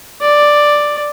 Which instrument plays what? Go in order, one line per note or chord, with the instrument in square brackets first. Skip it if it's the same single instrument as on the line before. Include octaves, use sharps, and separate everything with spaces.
[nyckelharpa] D5